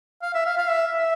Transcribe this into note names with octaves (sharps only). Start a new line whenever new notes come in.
F5
E5
F5
F5
E5
E5